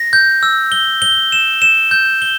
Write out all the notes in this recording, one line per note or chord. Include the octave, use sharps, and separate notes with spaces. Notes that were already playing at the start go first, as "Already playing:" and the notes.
Already playing: A#6
G6
E6
G7
G7
E7
E7
G6
G7